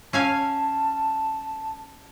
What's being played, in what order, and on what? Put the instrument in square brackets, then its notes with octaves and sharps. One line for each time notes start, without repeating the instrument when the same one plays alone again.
[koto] C#4 F5 G#5 [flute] A5